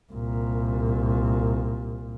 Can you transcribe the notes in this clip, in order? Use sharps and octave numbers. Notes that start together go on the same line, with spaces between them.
C2 A#2